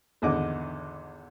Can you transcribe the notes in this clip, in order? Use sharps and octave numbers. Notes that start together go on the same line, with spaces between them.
G#1 E2 D3 D#5 D6